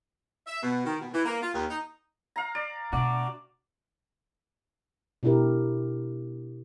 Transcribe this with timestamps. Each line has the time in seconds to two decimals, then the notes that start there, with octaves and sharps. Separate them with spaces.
0.47 E5
0.63 B2
0.85 D#3
1.00 B2
1.13 E3
1.26 A#3
1.41 F4
1.53 D#2
1.70 D#4
2.36 F5 A#5
2.55 D5
2.93 B2 D4 F#4 D6
5.23 B2 D4 E4 G4 A#4